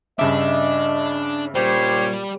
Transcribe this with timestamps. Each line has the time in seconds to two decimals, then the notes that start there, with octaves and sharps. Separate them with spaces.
0.19 G2 C#3 D4 D#5 E5
1.55 A#2 G3 G4 C5 C#5